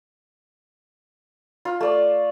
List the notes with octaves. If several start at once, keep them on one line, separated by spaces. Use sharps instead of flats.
F4
A3 D5